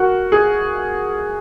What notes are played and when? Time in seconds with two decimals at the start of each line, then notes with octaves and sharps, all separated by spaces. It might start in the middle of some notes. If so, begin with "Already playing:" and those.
Already playing: F#4 A#4
0.32 G#4